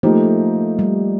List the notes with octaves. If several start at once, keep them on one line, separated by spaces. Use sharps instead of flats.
F3 A3 A#3 D#4 G4
G3